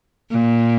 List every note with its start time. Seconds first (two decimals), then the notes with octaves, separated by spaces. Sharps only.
0.31 A#2